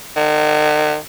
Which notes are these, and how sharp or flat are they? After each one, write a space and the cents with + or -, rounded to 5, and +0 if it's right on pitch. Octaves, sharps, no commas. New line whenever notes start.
D#3 -45